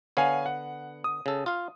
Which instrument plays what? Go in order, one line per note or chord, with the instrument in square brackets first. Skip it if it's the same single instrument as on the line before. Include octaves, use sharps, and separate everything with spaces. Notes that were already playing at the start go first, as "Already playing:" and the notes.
[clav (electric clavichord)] D3 B3 [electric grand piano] C#5 F5 G#5
[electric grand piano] F#5
D#6
[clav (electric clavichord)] C#3 A4
F4 F5